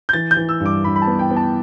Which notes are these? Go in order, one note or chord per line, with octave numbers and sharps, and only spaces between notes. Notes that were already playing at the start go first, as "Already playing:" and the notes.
G6
E3 A6
G6
E3
E6
G2
D6
G2 B5
B5
A5
B3
G5
B3
A5